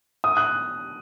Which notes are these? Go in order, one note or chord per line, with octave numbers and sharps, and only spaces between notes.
D#6
F#6